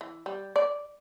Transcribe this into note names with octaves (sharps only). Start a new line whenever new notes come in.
E3
G3
D5